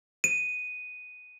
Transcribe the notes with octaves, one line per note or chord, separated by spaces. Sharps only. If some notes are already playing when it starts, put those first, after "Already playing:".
D#7